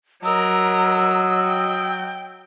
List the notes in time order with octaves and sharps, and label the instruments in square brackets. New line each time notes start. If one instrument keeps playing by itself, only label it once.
[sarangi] F#3 [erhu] A#4 [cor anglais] D#5 [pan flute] E6
[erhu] G5